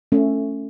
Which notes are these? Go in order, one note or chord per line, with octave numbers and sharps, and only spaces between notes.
A3 C#4